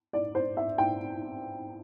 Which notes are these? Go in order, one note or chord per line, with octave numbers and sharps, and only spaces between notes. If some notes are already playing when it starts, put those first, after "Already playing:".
D5
C5
E5
G5